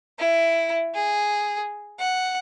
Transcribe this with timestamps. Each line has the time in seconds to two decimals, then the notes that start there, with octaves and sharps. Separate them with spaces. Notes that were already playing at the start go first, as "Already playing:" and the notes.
0.19 E4
0.95 G#4
1.99 F#5